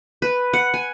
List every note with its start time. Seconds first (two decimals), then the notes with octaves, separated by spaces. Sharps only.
0.22 B4
0.53 F#5
0.74 G#5